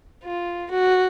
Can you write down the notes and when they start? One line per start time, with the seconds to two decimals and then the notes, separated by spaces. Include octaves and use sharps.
0.24 F4
0.70 F#4